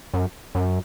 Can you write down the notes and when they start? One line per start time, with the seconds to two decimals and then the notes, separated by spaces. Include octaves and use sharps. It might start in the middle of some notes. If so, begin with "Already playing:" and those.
0.14 F#2
0.55 F#2